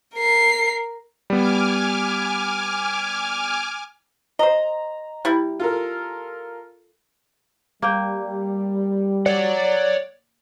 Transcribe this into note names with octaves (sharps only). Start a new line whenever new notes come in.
A#4 C7
G3 B3 G#5 D6 F6
C5 D#5 A#5
G3 E4
F4 A4 A#4
G3 A#3 G5
C#5 D5 F#5